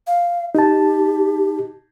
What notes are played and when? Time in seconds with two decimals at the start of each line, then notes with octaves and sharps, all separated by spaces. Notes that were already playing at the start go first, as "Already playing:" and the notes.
0.07 F5
0.55 D#4 G4 A5